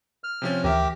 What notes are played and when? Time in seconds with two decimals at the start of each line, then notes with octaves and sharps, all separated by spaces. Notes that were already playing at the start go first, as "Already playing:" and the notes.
0.24 F6
0.42 C3 F3 C#4
0.64 D2 E3 G4 A#4 E5